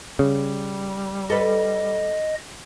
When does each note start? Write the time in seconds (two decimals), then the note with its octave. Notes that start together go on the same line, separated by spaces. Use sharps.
0.19 C#3 G3
1.30 A4 B4 D#5